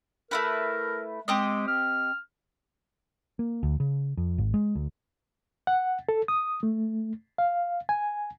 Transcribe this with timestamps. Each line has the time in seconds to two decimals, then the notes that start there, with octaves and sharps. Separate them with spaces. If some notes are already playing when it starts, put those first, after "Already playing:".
0.31 A3 E4 A#4 B4
1.28 G#3 C4 G4 D#5
1.68 F6
3.39 A#3
3.63 D2
3.80 C#3
4.17 F2
4.38 G#1
4.54 G#3
4.75 D2
5.67 F#5
6.09 A4
6.28 D#6
6.63 A3
7.38 F5
7.89 G#5